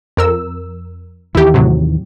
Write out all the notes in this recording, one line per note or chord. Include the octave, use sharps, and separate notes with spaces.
F2 A#4 E6
D#2 D#3 E3 E4 G4
A2 C3 F#3